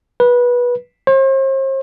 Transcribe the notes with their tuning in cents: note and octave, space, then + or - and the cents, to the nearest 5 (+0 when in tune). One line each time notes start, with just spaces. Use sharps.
B4 -20
C5 +40